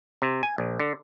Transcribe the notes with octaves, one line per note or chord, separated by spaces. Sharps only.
C3
G#5
A#1
D3